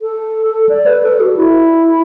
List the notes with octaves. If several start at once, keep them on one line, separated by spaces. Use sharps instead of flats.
A4
D5
B4
A4
F#4
E4